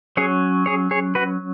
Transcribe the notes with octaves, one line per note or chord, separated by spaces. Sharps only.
F#3 C#4 G#4 C#5
G#4 C#5
G#4 C#5
F#4 B4